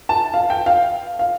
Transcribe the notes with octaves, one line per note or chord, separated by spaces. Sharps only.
A5
F5
G5
F5
F5